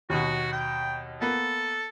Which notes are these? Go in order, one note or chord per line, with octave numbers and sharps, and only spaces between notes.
D#2 B2 F#4
G5
A#3 B3 A4